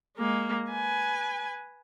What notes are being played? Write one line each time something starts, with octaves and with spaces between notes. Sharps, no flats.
G#3 A#3
B4 G#5